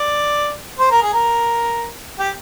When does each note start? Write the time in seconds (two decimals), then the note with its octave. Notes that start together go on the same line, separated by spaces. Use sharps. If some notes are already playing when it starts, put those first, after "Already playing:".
Already playing: D5
0.79 C5
0.91 A#4
1.02 G#4
1.13 A#4
2.19 G4